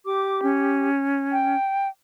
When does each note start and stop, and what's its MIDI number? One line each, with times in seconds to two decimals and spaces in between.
0.06 0.89 67
0.06 0.40 86
0.43 1.56 61
1.32 1.88 79